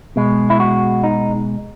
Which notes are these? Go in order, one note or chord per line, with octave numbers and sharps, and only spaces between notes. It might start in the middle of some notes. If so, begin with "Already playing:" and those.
B2 G#3
E4
F#4
D#4